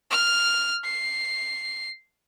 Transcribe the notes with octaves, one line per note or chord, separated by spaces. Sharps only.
F6
C7